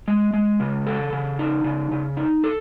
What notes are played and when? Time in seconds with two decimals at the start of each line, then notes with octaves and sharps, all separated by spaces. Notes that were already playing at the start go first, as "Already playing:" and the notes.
0.08 G#3
0.34 G#3
0.60 C#3
0.87 A4
1.13 C#3
1.39 D#4
1.64 C#3
1.91 C#3
2.17 D#4
2.44 A4